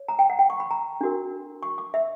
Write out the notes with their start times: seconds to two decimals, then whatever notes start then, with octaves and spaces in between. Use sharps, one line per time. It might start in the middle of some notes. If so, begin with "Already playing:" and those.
Already playing: C#5
0.08 A#5
0.19 G5
0.30 F#5
0.39 G5
0.50 C#6
0.60 B5
0.71 A#5
1.01 D4 F#4 A#4
1.63 C#6
1.78 D6
1.94 E5